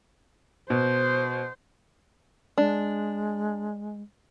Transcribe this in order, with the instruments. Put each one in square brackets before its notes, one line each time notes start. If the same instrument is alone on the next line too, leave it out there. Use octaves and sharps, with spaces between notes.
[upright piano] B2 [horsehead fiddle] C5
[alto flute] G#3 [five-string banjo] D4